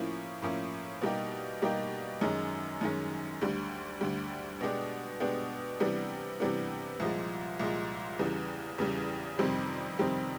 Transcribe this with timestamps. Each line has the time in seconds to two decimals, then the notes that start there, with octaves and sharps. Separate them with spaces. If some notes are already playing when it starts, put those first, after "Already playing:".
Already playing: A2 F3 A#3 C#4 E4
0.42 A2 F3 A#3 C#4 E4
1.02 B2 G3 A#3 D#4 G4
1.62 B2 G3 A#3 D#4 G4
2.21 F#2 D#3 G#3 C#4
2.81 F#2 D#3 G#3 C#4
3.41 D2 D3 G3
4.01 D2 D3 G3
4.61 B2 G#3 B3 D4 G4
5.20 B2 G#3 B3 D4 G4
5.80 C3 E3 G3 B3 D4
6.40 C3 E3 G3 B3 D4
7.00 C2 A#2 F3 G#3
7.59 C2 A#2 F3 G#3
8.19 E2 C#3 E3 G3
8.78 E2 C#3 E3 G3
9.39 F2 C3 D#3 G3 C4
9.99 F2 C3 D#3 G3 C4